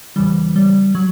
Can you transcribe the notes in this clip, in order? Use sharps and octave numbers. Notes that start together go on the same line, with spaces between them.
E2 C#3 E3 G3
G3
F#3